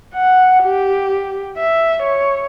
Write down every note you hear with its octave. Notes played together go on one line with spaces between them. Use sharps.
F#5
G4
E5
C#5